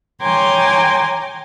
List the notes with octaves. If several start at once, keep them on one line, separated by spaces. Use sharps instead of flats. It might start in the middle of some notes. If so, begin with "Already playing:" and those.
C#5 G5 G#5 A#5 C6 D6